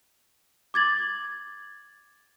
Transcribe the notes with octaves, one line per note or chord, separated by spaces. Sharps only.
D6 G#6 A6 F#7